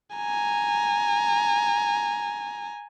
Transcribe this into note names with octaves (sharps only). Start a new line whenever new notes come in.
G#5 A#5